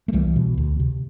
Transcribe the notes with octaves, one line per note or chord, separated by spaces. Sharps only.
A3
C2 E3 G3
B2
D2
C3